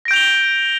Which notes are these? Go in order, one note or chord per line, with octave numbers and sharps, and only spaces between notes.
G6 A#6 D7 F7 G7